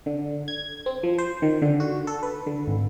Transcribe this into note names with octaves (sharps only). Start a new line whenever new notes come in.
D3
G#6
C4
F3
C5
D#3
D3
F#4
A4
B4
D3
G#1